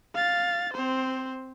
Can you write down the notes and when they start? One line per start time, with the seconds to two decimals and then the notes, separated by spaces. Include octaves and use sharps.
0.14 F5 A6
0.74 C4 C5